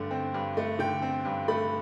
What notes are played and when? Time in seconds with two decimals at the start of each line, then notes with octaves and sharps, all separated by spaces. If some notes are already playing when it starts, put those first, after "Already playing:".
Already playing: G2 D3 A3
0.11 C4
0.34 G2
0.57 A3
0.79 D3 G5
1.02 C4
1.25 G2
1.48 A3 B5